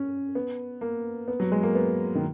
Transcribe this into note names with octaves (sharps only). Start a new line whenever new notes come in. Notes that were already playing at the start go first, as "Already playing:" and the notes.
Already playing: C#4
B3
A#3
B3
F#3
G#3
A#3
B3
D#3